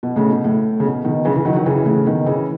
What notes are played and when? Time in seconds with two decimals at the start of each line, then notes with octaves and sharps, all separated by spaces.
0.03 B2
0.16 A2 C#3
0.30 B2
0.44 A2
0.80 C#3
0.84 B2
1.04 B2 D#3
1.25 C#3 E3
1.36 C#3 E3
1.45 D#3 F#3
1.56 D#3 F#3
1.66 C#3 E3
1.86 A2 C#3
2.06 B2 D#3
2.26 C#3 E3